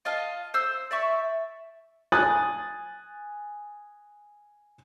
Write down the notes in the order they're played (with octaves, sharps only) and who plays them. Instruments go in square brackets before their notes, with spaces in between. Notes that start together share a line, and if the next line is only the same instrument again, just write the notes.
[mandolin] F4 D#5 F5 A5
C5 E6
D5 E5 C#6
[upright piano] G#5 D#6 F#6 A6